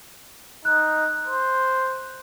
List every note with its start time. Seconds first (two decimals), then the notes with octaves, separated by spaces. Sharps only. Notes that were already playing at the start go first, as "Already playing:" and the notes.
0.65 D#4 F#6
1.28 C5